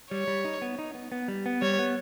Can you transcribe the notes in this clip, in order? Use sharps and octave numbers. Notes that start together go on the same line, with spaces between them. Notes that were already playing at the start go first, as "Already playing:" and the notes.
G3 C#5
G3
D#4
B3
D#4
B3
B3
G3
B3
G3 C#5
B3